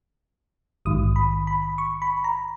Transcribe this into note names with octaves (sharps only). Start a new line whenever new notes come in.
A#1 G#2 D#3 D#6
B5
B5
C#6
B5
A#5